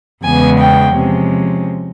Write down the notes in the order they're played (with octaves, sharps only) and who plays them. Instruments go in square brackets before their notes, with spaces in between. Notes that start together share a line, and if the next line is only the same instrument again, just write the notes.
[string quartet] E2 C#3 E3 G#3 B3 G#5
G5
C3 F3 G#3 C#4